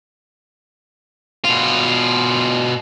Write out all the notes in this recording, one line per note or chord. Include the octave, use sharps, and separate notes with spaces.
B2 F4